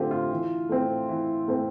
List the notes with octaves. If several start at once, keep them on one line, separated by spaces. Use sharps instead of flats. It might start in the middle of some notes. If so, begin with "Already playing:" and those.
Already playing: D3 A3 C4 F4 G4
F4
E3
A3 C4
E3
A3 C4